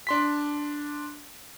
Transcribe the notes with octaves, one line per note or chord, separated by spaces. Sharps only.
D4 C6 B6